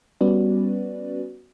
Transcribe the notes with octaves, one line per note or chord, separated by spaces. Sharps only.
G3 B3 C#4 F#4 B4 D5